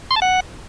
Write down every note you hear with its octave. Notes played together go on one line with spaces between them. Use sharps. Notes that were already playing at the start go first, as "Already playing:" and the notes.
C6
A5
F#5